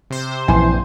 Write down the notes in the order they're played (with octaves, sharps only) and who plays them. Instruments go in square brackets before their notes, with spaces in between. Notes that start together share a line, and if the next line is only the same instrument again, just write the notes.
[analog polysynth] C3 C5
[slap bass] A#1 G2 [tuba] E3 [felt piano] G#5 C6